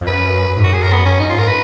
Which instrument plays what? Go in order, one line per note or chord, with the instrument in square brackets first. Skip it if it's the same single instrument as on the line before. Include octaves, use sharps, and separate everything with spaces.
[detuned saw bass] F2
[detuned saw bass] F#2 [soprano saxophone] B4
[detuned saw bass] G#2
[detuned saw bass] F#2 [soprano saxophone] F#4
[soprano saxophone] G#4
A#4
B3
C#4
[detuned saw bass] F#2 [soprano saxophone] D#4
[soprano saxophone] F4
[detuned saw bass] G#2
[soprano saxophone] A#4
B4